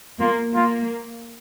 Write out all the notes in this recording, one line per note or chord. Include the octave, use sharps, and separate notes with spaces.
A#3 F4
A#3 F4